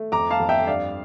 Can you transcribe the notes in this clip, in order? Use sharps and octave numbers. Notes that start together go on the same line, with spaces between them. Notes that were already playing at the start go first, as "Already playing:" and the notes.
Already playing: A3
F2 A#5 D6
F5 A5
F2
E5 G5
G2 D5 F5